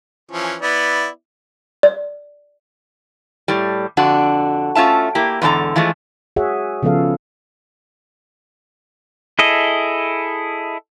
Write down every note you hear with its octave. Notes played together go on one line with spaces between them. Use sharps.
E3 F3 C#4
B3 E4 D5
D5
A2 G3
F2 D3 D4 F#4
A3 C#4 F4 E5 A5
A#3 E4 G4
E2 G#2 D3 D4 A4 A#5
E3 F3 G#3 A3
F#4 G#4 C#5 E5 F#5
C#3 F3 B3 A4 F5
E4 G#4 A4 D#5